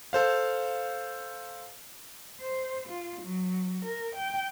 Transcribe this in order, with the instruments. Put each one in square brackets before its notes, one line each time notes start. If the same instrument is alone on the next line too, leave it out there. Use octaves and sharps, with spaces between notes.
[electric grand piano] A4 C5 F5
[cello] C5
F4
F#3
A#4
G5